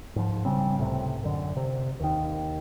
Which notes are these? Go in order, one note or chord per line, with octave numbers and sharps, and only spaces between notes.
G#2 F3
A#1 C#3 G3 C4
C#2 A2 C3
F#2 D3
C3
D#2 D#3